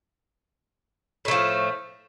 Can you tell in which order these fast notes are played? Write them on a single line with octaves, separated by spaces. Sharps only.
A2 A3 F3